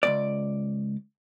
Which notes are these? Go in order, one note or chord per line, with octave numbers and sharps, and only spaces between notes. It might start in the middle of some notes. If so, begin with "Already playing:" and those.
C#2 G2 D5